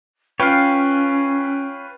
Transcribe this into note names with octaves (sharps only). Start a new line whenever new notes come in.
C#4 F4 B4 C#5 F5 G5